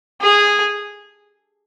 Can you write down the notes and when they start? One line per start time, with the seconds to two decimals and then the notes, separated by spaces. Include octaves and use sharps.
0.21 G#4